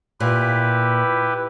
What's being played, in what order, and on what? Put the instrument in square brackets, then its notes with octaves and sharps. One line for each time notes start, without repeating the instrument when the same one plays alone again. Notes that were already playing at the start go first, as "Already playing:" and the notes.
[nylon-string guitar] A#2 [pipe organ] E4 G4 B4